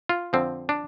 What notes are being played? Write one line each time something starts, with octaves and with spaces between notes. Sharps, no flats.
F4
F2 D3 F3 C4
D4